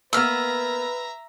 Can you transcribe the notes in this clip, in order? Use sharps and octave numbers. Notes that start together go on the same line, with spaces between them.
A#3 B3 B4 E5 A#5 E6 F6